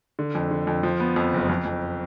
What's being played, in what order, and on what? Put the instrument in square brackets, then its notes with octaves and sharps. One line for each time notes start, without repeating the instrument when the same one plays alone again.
[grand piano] D3
F2
D3
F2
F3
B3
F2
F#1
F2
F2